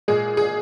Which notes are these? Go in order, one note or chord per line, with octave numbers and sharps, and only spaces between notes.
A#2 G#3 G#4
G#4